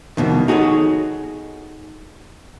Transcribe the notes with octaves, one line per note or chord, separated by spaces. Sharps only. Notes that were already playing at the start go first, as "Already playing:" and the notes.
C2 F2 B2 D#3
D#4 F#4 G#4 A4 C#5